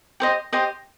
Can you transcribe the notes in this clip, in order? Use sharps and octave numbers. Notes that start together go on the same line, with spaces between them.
G4 C5 D#5
G4 C5 D#5